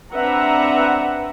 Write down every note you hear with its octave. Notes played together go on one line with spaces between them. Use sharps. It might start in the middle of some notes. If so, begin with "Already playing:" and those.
C4 D4 B4 E5 F#5 A#5